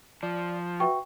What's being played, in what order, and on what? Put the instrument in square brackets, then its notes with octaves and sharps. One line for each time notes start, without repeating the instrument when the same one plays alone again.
[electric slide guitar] F3 [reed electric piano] D5
[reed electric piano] F#4 B4 E5 [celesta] G5 C#6